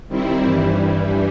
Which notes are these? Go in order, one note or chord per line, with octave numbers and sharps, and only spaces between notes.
D#3 G3 C4 E4
G2 E3 G3